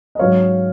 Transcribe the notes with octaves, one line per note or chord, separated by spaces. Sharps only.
D#5
G#2 F#3 C#4 C#5 F5